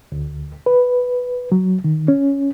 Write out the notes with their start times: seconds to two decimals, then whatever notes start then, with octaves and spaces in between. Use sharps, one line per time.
0.12 D2
0.66 B4
1.52 F#3
1.84 D#3
2.08 C#4